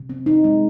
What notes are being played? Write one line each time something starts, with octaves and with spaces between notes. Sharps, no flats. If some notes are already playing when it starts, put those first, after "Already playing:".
Already playing: C3
C4
D#4
G#3